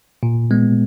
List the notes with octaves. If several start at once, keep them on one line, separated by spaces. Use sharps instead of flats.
A#2
G#3 B3